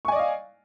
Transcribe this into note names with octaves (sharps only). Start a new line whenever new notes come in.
D5 D#5 F5 G#5 C#6